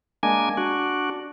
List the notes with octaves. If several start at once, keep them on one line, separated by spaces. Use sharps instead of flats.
G#3 A#3 D4 G#5
D4 F#4